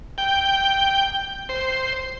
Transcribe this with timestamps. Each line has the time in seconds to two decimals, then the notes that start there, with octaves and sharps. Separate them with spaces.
0.18 G5
1.49 C5